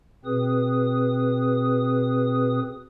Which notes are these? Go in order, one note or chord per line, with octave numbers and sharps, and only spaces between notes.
B2 C4 G#4 B4 D#6